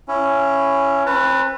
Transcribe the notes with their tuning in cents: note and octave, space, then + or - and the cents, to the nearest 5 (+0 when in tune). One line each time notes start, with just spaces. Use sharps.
C#4 +0 E4 +20
C4 +40 B4 +0 A5 +45